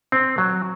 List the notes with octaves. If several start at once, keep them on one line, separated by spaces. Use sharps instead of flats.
C4
F#3